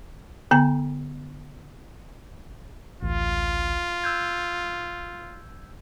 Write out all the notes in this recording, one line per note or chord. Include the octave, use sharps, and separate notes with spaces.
D3 B3 G#5 A#5
A1 D2 F4
E6 G6 G#6